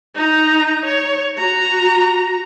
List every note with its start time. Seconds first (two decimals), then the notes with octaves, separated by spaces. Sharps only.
0.15 D#4 A#5
0.85 C#5
1.38 F#4 A#5